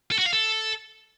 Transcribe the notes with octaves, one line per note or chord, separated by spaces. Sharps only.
A4
F#4
F5
A4